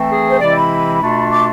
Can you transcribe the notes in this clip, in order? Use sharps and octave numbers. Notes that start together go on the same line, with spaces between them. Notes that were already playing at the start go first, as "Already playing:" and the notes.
Already playing: E3 A3 C4
G#4
C5
C3 E3 G#3 C4 E4 D5
B5
B2 A3 D4 F4
D6